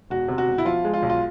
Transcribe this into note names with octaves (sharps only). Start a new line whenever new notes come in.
E1 F#4
C3
F#4
E1
E4
F3 F4
G#3
F4
B1
F4